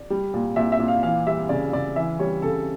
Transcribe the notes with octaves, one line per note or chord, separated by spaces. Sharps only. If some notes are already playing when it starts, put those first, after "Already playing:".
Already playing: D5
G3
A#2
A#2 E5
E5
A#2
F5
E3 F5
G3 E5
C#3 D5
C#3 D5
E3 E5
G3 C#5
C#3 A4